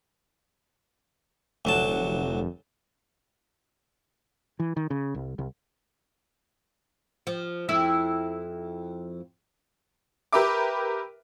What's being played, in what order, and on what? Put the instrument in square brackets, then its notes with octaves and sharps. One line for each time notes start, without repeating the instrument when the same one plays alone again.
[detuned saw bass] F1 [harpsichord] D2 F#3 A5
[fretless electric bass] E3
D#3
C#3
C2
C2
[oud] F3
F2 E4 E5
[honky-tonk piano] G4 A#4 B4 E5 D6